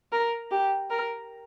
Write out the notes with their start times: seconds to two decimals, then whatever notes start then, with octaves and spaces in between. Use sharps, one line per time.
0.12 A#4
0.51 G4
0.90 A#4